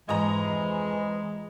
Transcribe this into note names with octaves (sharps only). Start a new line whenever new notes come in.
F2 G#2 E3 F3 G#3 D#5 A#5